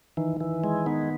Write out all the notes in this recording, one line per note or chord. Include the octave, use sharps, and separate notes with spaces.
D#3 E3 D#4
E3
G#3
D#3 B3 D#4